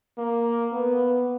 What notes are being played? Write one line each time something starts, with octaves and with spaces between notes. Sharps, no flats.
A#3
B3